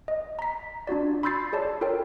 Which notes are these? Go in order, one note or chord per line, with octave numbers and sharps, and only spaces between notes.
D#5
A#5 B6
D4 F4 F#4 D5
B5 C6 E6 G6 A6 C7
G#4 C#5 D5 A5
F4 A4 A#4 C#5 G5